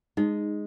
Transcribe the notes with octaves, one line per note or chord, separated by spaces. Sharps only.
G#3 D#4